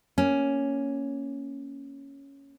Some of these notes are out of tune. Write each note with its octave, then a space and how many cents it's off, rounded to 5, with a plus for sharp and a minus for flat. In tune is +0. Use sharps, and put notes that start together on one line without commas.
A#3 +0 C#4 +0